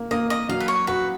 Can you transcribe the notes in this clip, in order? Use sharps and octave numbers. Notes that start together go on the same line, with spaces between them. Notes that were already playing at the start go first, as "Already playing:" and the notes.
Already playing: A#3
A#3 D#5
D#5
F#3 F5
B4
C#5
F#4 B4